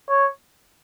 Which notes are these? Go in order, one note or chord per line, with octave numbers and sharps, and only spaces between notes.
C#5